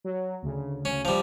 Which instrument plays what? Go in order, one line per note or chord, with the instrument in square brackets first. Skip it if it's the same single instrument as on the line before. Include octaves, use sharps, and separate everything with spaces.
[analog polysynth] F#3
D2 C#3
[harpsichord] C#4
F3 G3